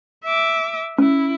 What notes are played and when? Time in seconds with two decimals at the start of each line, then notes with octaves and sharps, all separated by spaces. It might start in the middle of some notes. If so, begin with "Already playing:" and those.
0.24 E5 D6
0.98 C#4 E4